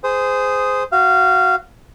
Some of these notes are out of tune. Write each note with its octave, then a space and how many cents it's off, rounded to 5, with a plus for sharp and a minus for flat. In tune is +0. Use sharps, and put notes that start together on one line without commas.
G#4 +0 C5 -20 D#6 +0
F#4 +0 F5 -20